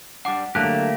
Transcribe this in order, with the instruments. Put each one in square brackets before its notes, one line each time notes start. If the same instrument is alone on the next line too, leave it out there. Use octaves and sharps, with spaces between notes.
[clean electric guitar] G3 D4 [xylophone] F#5 D6
[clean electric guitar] D3 F#3 [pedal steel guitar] A3 A#3 G4 [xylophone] A5 F#6